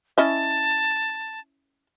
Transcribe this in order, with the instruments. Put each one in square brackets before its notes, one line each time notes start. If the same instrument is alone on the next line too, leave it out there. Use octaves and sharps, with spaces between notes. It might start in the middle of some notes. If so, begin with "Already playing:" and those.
[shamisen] C#4 E4 D#5 [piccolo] A5